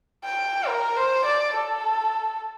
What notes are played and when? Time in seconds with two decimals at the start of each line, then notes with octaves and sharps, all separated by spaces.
0.24 G5
0.68 A#4
0.97 C5
1.26 D5
1.55 A4